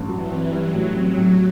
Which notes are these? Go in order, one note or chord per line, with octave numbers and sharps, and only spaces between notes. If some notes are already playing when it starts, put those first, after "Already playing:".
Already playing: A1 G2
E3 F#3
C4
F#3 G3
A2
F#3 C4
A2